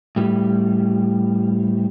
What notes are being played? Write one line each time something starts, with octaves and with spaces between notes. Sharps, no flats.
A2 G3